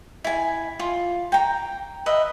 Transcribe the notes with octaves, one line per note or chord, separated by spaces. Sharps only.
E4 G#5
F4
G5 A#5
B4 D#5 E5